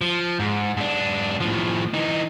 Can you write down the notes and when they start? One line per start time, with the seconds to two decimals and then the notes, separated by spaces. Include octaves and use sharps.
0.01 F3
0.40 G#2
0.77 G#2 D4
1.40 A2 F3
1.94 E3 D#4